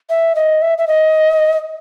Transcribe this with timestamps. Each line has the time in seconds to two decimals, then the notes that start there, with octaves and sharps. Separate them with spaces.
0.10 E5
0.35 D#5
0.62 E5
0.78 E5
0.87 D#5